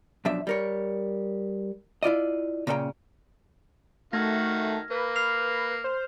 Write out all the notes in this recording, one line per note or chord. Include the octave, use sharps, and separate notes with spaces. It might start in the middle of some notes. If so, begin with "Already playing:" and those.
F#2 B2 F3 D4 E5
G3 A#4 C#5
E4 F4 D5 D#5
A#2 C#3 C#4 A4 G5 A#5
D#3 A3 F#4 F6 G#6 A#6
A#3 B4
F6 C7 F7
C5